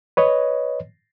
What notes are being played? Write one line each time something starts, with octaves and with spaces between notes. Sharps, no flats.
B4 C#5 D#5